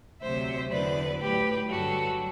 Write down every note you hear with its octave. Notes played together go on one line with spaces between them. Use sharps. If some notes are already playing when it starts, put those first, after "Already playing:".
D2 C3 F#3 C5 E5
E2 D3 F#3 B4 D5
A2 F#3 G4 B4
G2 D3 F#3 F#4 A4